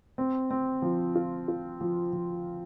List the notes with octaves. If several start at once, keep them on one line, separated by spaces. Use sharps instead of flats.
C4
C4
F3
F4
F4
F3
F3